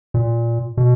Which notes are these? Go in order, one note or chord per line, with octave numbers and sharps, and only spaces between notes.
A#2
B2